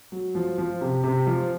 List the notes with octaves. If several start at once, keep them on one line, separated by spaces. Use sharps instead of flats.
F#3
F3
F3
C3
C3
F3